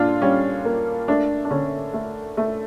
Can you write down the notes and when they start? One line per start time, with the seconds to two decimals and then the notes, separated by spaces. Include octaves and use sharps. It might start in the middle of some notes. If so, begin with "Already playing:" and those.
Already playing: A#2 D4 F4
0.22 G3 C#4
0.65 A#3
1.08 A3 D4
1.45 D4
1.50 D3 C#4
1.94 A3
2.37 A3